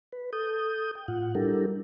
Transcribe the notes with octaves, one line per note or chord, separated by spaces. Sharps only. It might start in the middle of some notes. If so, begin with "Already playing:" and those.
B4
A4 D#6 G6
G5
A2 F4 F#5
G3 D4 E4 G4 A4 A#4